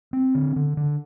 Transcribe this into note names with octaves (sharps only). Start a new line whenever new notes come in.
C4
D3
D3
D3